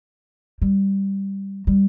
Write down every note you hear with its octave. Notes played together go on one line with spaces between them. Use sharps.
G3
G3